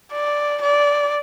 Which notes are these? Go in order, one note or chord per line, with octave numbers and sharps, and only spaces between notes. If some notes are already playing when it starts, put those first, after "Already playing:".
D5
D5